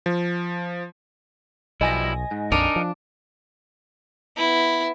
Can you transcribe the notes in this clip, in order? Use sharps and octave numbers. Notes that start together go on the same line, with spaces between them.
F3
B1 F3 G3 E4 D#5 G#5 A#6
G#2
A#1 F2 D4 D#4 A#4
F3
B3 E4